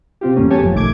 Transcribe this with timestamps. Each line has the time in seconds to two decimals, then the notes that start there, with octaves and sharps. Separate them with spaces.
0.21 C3 C4 F4 G4
0.36 E2 G2 A3 A#3 C#4
0.50 A3 B3 G4 C#5 G#5 A5
0.62 G1 F#2 F3
0.73 B1 D#3 A3 D6 G#6